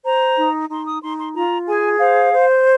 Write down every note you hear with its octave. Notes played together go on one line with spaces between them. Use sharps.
C5 A#5
D#4
D#4 C6
D#6
D#4 C6
C6
F4 A#5
G#4 G#5
C5 F5
C5